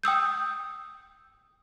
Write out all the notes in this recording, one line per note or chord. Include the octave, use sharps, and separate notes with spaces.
G5 D#6 E6 G6